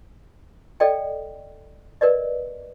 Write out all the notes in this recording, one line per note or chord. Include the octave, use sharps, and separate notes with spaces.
A4 D5 D#5 G5
A#4 B4 D5 D#5